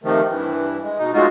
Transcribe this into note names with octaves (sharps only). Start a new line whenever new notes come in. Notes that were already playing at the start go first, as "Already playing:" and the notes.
C3 D#3 F3 A3
G2 E3
G#3
B2 D#4
F#3 G#3 A3 D#4 F4 F#4